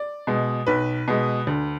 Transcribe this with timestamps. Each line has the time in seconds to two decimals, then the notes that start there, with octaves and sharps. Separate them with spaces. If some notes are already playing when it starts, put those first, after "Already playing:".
Already playing: D5
0.27 B2 G#3
0.67 B1 B4
1.08 B2 G#3
1.47 D2